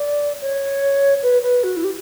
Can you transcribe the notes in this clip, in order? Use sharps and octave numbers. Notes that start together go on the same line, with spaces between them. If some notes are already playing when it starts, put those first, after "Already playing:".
Already playing: D5
C#5
B4
B4
F#4
E4
G4